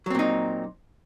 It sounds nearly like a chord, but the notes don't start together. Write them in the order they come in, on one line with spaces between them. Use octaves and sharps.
F#3 C4 A#2 D#4